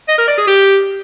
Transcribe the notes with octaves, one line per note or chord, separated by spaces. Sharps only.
D#5
A#4
D5
G#4
G4